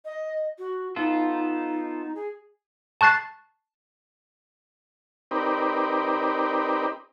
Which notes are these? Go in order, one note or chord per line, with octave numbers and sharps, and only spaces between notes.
D#5
F#4
B3 D#4 F4 A4
G#4
A5 C#6 F#6 A6 C7
C4 D#4 G4 A#4 B4 D5